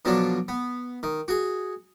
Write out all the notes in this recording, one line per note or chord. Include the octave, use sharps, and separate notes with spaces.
B2 D3 F3 F#3 D4
B3
D#3
F#4 G#4